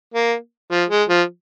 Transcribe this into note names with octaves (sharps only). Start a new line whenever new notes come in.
A#3
F3
G#3
F3